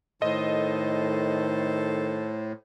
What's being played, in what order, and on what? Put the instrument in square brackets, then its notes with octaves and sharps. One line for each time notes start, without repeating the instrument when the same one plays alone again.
[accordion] A2 [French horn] D#3 [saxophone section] A4 C5 [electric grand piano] D#5